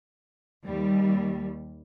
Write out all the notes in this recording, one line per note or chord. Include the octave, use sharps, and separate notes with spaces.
D#2 G3